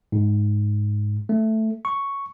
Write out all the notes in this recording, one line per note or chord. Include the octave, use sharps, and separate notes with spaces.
G#2
A3
C#6